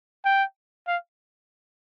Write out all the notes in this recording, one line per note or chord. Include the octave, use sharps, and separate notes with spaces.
G5
F5